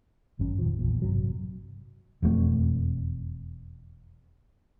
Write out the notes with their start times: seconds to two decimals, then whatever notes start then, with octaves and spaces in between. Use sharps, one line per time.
0.39 G#1 F#2 C#4
0.59 F2 A#2 D#3 F3
0.79 A#1 E2 A#2
1.02 A1 G2 C3 F#3
2.22 E1 F2 A3